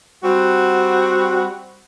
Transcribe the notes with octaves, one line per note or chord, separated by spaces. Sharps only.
G3 C4 F#4